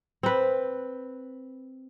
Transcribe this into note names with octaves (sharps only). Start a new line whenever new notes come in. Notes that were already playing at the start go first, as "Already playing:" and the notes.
C4 B4